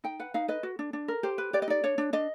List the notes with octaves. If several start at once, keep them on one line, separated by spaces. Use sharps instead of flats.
D#4 G5
B4 F#5
D#4 F5
B4 D#5
F#4
D4
D4
A#4
G4 C5
B4
G4 D5
D#5
D#4 D5
D4 C#5
D4
D4 D#5